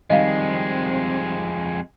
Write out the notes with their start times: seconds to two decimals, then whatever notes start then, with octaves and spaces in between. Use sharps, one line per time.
0.10 F2 D#3 G3 G#3 C4 D#5 F5